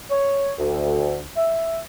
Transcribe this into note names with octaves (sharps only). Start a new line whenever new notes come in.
C#5
D2
E5